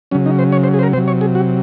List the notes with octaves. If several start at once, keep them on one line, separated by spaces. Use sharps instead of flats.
C#3 F#3 C#4
D#4
C5
C#5
C5
G#4
C5
A#4
C3 F#3 C5
C#5
G#4
F#4